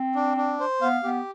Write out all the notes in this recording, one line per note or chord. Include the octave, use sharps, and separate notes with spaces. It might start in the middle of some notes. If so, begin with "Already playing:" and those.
Already playing: C4
D4
D4
C5
B3 F5
B3 G4